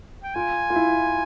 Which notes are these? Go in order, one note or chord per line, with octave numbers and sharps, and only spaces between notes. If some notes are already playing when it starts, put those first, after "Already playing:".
G5
F4 G#5
F4
E4